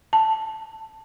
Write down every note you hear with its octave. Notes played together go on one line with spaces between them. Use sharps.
A5